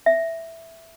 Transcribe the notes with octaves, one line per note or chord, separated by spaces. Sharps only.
E5